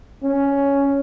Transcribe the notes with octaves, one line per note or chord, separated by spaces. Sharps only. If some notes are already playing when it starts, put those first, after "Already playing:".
C#4